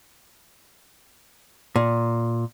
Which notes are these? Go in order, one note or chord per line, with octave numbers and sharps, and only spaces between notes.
A#2